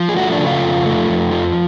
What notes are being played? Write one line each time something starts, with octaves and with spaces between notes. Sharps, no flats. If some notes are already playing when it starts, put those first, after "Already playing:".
Already playing: F3
G#4
A3 F#4
D4
C#3
F4
F2
A3
F2
F3